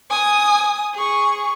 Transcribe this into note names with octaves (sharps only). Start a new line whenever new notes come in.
G#5 D#6
G#4 C#6